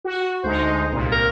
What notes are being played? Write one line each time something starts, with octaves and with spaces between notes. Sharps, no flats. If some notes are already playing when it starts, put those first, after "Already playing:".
F#4
D2 G#3 D#4 C5
C2 A#2
A#4